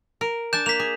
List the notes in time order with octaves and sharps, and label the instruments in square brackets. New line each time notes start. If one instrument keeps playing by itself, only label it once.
[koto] A#4
[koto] D4 G#5 A5 [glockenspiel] G6 E7
[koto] A#3 [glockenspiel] B6 F7
[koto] G#4